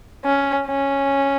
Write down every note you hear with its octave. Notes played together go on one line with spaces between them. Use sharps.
C#4
C#4